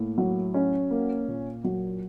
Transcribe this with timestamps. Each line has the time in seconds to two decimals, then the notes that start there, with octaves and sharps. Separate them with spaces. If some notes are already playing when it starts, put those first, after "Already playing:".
Already playing: A2 A#3
0.18 F#3
0.54 C#4
0.91 A#3
1.28 A#2
1.64 F#3